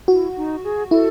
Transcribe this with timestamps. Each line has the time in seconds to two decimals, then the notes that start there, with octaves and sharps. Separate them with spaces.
0.08 E4 F#4
0.37 D#4
0.64 G#4
0.91 E4 A4